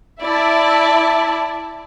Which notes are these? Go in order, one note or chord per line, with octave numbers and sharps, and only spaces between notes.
E4 D5 E5 A5